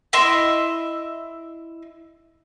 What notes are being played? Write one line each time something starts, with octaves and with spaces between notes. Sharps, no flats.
E4 D#5 E5 C6